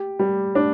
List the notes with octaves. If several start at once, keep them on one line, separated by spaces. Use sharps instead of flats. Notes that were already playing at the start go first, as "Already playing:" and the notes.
Already playing: G4
G3
D4